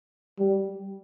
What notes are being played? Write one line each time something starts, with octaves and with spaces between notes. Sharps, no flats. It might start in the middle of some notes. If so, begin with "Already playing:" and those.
G3